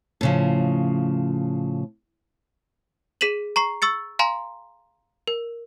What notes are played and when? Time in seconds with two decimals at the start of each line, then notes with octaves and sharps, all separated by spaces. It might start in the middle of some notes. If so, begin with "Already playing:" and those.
0.21 A2 C#3 F3
3.21 G#4 B6 D#7 E7 F#7
3.56 A#5 C#6 C7
3.82 C#6 E6 A6 C#7
4.19 F5 G#5 A#5 C6
5.27 A#4